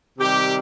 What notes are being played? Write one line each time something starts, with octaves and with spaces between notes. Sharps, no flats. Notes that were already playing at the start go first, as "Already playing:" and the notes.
C3 D#3 G3 G4